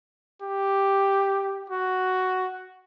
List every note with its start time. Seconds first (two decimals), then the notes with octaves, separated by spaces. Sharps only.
0.42 G4
1.70 F#4